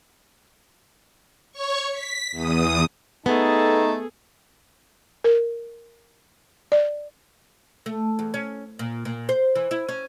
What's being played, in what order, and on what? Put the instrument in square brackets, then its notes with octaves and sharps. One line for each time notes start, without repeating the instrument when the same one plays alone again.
[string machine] C#5 C#6
B6
E2 D#6
[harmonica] A3 A5 [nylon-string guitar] B3 [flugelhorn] D#4 [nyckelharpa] G#4 A4
[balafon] A#4
D5
[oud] A3
E2
C#4
A#2
A#2
C5
E3
E4
C#4